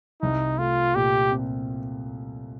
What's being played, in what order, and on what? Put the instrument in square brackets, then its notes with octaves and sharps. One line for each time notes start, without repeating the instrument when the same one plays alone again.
[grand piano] C2 [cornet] D#4
[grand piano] A3 [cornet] F4
[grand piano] A#2 [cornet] G4
[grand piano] C4